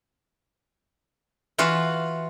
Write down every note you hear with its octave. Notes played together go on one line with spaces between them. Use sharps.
E3 F4 F#4 B4